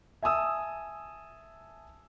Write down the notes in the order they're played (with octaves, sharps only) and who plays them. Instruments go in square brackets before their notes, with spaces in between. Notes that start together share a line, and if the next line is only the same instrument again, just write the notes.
[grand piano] E5 G#5 A5 D#6 E6